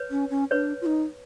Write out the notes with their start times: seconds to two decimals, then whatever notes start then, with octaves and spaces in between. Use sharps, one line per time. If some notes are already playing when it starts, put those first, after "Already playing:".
Already playing: B4 C#5
0.11 C#4
0.30 C#4
0.51 D4 B4 C#5
0.82 F4
0.86 D#4